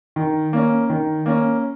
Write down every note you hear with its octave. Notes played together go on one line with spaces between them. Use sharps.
D#3
A#3 C#4
D#3
A#3 C#4